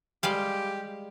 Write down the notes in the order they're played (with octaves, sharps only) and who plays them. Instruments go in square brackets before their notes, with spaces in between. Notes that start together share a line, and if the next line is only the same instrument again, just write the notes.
[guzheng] G3 G#3 F5 [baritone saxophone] G4